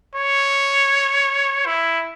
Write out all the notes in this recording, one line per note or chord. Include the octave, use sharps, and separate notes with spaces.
C#5
E4